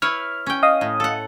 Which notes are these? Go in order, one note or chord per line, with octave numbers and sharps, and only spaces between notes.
E4 B4 C#5 F6
C#4 G5
D#5 F5 D#6
A2
A4 F#5